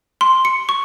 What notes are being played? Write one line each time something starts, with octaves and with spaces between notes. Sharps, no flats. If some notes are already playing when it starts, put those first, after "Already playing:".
C6
C#7
C#6